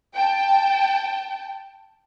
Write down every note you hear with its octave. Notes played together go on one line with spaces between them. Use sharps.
G5 A5